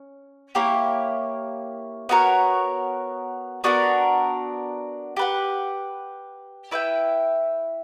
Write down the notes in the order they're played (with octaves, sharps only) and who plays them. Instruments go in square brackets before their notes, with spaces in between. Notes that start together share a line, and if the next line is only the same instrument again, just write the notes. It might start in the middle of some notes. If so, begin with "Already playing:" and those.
Already playing: [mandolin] C#4
A#3 E4 G4 C#5
B3 F#4 A#4 C#5
B3 D4 F#4 A#4
G4 B4 F#5
E4 B4 E5 G5